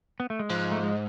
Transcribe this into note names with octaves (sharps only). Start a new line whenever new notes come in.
B3
A3
G#3
G#2 F3
A3
G#3